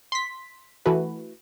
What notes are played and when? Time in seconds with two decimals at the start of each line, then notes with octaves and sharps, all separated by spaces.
0.12 C6 B6
0.86 E3 A3 F#4 B4